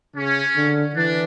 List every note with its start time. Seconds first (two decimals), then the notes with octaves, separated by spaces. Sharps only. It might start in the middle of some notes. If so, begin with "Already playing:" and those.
0.16 C#3 C#4
0.56 D3
0.96 E3 D4